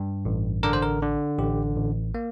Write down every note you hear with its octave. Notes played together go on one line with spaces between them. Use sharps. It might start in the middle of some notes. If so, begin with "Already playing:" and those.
Already playing: G2
A1
D3 A#4
C5
A#4
D3
A1 G4
A1
A#3